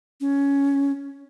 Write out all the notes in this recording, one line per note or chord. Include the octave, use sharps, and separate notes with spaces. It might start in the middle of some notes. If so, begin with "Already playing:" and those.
C#4